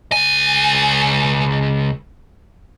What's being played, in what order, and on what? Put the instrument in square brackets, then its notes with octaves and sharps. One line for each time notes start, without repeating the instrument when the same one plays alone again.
[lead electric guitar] C#2 G#5